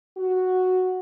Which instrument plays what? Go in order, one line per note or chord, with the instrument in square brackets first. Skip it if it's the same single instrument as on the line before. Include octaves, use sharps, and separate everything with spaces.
[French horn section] F#4